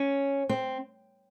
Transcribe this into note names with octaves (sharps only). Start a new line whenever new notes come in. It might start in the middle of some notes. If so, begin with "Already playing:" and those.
Already playing: C#4
C4